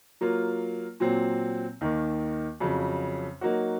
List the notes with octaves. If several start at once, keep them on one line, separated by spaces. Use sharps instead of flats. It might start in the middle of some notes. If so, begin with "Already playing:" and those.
F#3 A#3 F4
A#2 F#3 C4
D#2 D#3 A#3
F2 C#3 F#3
F#3 A#3 D#4 F#4